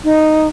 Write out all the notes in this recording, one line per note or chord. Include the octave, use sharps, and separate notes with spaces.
D#4